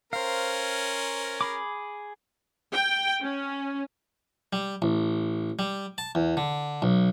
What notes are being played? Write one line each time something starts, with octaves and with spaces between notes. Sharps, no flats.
C#4 A#4 C5 F5
G#4 B5 D6
G5
C#4
G3
A1
G3
A5
E2
D3
B1